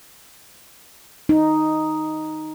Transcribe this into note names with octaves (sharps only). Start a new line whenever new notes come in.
D#4